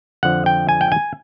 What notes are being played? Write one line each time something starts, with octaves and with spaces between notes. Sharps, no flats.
F2 D3 F3 F#5
G5
G#5
G5
G#5